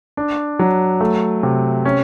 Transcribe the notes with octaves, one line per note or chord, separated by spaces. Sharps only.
D4
F#3
A3
C3
C#4